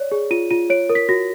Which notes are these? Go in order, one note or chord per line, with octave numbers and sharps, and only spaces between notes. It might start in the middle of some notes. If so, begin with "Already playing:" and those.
Already playing: C#5 D5
G#4
F4 D#7
F4 D#7
C#5 D7
A#4
B6
F#4 A#6